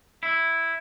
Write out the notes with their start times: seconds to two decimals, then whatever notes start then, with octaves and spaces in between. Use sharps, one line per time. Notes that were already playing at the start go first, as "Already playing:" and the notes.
0.23 E4